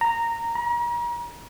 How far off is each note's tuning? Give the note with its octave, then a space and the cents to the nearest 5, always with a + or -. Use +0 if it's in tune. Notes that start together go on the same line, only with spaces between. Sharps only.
A#5 -10
A#5 +40